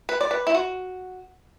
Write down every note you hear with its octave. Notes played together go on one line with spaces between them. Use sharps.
B4
D5
B4
E4
F#4